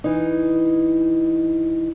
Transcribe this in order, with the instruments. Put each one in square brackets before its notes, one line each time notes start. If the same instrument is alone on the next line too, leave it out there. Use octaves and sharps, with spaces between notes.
[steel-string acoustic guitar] E3 D#4